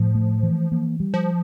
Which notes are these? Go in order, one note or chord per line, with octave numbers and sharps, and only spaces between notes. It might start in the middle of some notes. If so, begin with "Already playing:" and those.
Already playing: A2 F3
A3
E3
A#3
G3
F3